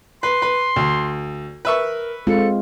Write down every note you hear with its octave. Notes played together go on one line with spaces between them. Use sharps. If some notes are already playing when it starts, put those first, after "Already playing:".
B4 C6
B4
D2
A#4 B4 E5 C#6
G#3 C4 F4 A4